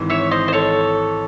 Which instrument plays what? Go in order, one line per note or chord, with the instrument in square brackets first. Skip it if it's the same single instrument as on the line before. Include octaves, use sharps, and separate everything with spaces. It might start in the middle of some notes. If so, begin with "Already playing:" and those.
Already playing: [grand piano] G#1 G#2 E3
[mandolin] C#5 E5
C5 D#5
C5
A4 C#5